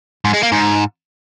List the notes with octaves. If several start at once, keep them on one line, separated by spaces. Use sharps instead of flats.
G#2
G#3
A#3
G#2